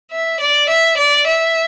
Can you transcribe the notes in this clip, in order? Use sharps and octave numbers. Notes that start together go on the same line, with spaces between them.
E5
D5
E5
D5
E5